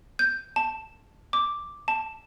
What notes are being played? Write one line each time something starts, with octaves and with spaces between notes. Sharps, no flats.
G6
A5
D6
A5